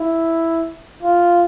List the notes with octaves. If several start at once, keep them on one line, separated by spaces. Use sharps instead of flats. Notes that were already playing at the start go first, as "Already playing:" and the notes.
Already playing: E4
F4